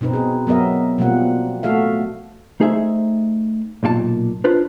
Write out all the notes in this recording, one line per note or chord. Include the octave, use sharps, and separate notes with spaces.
B2 C4 D#4 B4
C4 G#4
F#3 B3 A#4 D#5 E5
B2 F3 G3 A#3 C4 F#5
A3 F#4 A4 E5 F5
A3 D#4 G#4 C5 C#5 E5
B1 A#2 F4 A5
D4 F4 B4 C5